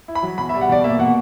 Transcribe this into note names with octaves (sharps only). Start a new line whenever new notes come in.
E4
B5
F#3
B2 B5
E5
G3
F#5
B2 D5
A#3 E5
B2 F#5